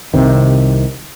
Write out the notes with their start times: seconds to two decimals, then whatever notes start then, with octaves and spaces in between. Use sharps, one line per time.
0.14 C2 C3 D#3